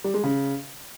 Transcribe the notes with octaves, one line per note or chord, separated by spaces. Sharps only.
G3
G#3
C#3